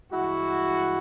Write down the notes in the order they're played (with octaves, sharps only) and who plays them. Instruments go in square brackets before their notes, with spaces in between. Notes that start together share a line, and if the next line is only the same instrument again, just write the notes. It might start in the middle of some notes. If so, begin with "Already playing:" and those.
[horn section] G2 E3 G#3 E4 F#4